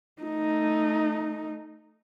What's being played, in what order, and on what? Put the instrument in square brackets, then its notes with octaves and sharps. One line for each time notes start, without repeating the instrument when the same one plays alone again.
[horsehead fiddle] A3 D#4